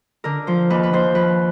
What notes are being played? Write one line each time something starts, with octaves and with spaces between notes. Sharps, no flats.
D3 A#4
F3 C5
D#2 B4
B4
D#2 C5
F3 B4